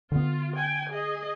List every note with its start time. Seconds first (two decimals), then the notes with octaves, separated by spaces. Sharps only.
0.12 D3 B3 F4
0.56 G5 G#5
0.89 G#4 D#5